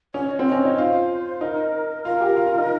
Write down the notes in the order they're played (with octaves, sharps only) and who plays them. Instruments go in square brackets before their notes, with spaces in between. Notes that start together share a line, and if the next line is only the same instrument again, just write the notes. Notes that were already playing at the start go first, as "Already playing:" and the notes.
[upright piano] C#4 [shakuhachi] C#5
[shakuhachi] D#5
[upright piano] C4
[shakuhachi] D#5
[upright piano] C#4
[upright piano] D#4 [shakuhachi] C#5
[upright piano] F4 [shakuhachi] C5
[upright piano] D#4 [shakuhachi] A#4
[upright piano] F4 [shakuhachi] A#4
[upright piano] G4
F4
F4
D#4